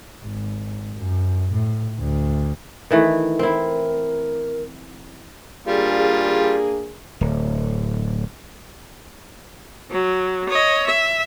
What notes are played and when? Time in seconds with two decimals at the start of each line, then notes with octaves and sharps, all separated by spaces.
0.24 G#1
0.97 F#2
1.52 A2
1.99 D2
2.91 D#3 E3 A3
3.39 C4 E4 A#4
5.67 G3 A#3 D4 F4 G#4
7.21 D1
9.91 F#3
10.49 C#5 D#5
10.86 E5